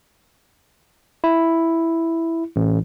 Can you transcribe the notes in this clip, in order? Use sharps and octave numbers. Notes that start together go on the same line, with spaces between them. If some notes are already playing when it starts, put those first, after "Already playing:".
E4
A1